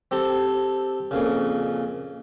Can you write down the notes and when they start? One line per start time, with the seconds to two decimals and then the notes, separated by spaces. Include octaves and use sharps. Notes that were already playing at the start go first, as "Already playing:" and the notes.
0.11 C4 G4 A4 A5
1.11 F2 A#2 C#3